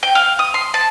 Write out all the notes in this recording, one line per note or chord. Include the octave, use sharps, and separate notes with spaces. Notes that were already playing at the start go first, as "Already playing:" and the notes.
G5
F5
D#6
C6
A5